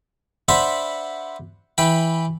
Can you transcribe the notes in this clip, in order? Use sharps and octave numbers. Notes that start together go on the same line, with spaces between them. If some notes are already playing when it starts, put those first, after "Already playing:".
D4 C5 E5 F#5 B5 C6
E3 G5 B5